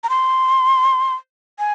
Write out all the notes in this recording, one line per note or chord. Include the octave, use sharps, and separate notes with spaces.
A#5
C6
G#5